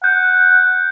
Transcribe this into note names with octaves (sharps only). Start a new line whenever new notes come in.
F#5 G6